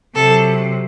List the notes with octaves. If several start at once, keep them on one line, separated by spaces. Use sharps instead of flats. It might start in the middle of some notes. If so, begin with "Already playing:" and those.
C3 F#3 A4